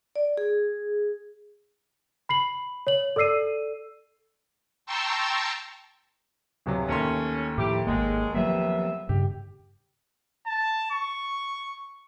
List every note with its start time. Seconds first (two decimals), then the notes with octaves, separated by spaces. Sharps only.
0.16 D5
0.37 G#4
2.29 B5 C7 F#7
2.87 C#5 F#7
3.16 A4 D5 E6 C7 D#7
4.86 G5 A5 A#5 C6 C#6 E6
6.66 D1 C3 F#3
6.89 D#2 A3 C#4 C6
7.58 A2 F3 E4 G4
7.87 G#1 F#2 G#3 A#3
8.34 C3 F3 F#3 A#3 B3 E5
9.09 G2 C#3 G4
10.46 A5
10.91 C#6